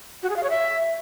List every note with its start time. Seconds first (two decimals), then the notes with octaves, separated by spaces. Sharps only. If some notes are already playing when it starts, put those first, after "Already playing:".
0.23 F#4
0.30 G#4
0.36 F5
0.43 C#5
0.50 E5